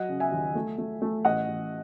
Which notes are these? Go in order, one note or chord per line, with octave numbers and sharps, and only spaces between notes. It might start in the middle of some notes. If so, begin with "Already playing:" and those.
Already playing: F#3 D#5 F#5
C#3
E5 G#5
D#2
A3
A3
A3
A1 D#5 F#5
A1